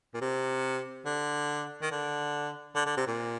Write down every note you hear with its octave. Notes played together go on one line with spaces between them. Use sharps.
A#2
C3
D3
D#3
D3
D3
D3
C3
A#2